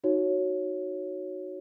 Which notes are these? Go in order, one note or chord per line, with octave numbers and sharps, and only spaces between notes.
D#4 F#4 C#5